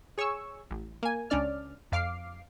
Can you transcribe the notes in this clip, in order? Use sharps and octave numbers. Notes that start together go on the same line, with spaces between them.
G#4 C#5 G#5 C#6 E6
A1
A#3 G#5
C#2 C#4 D4 D5 F6
F2 F5 D6 F6 C7